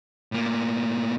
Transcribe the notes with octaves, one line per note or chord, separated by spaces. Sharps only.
A2 A#3